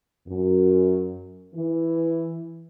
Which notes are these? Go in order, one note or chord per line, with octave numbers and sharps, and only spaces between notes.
F#2
E3